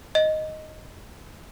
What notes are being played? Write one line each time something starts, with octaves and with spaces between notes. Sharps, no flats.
D#5